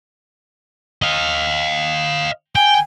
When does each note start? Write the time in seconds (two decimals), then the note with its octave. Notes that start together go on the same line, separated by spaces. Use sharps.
1.02 D#5 F5
2.55 G5 G#5